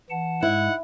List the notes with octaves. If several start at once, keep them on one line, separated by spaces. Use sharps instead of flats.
E3 F#5 A5
G#2 G#3 E4 F#5